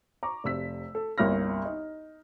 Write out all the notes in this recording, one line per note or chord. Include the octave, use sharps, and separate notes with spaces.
A#5 C#6 D6
F1 C3 E6 B6
A4
G1 C2 A#3 F6 A#6
D#4